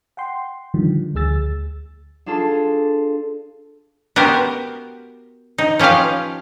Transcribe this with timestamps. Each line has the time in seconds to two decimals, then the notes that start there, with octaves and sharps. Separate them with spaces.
0.17 F#5 G5 C6
0.74 D3 D#3 F3 G3
1.15 D2 G#4 E6 A6
2.26 D4 F4 G#4 A4 A5 C6
4.16 B3 F#4 G4 A#4 C5
5.58 D#4
5.79 F3 C#4 G4 B4 F5